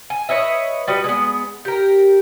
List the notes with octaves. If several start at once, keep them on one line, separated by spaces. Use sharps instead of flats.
G#5
B4 C#5 D#5 E5
G3 F#4 B4 D#5
G#3 B3
G4 A#4